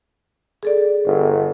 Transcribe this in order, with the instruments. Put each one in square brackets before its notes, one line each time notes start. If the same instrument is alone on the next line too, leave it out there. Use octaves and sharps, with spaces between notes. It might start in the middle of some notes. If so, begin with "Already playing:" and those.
[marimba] G#4 A4 D5
[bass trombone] G1